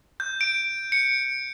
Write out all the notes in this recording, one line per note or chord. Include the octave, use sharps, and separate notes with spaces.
G6
D7
C#7